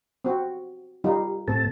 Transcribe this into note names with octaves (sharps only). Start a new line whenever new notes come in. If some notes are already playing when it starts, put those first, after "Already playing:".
C4 F#4
G3 D#4 F4
A2 C4 A4 A5